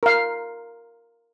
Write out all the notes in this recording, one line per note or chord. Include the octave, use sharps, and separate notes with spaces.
A#4 F5